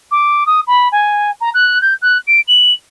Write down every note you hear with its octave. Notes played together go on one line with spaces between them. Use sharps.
D6
D#6
B5
G#5
A#5
F#6
G6
F#6
D7
F#7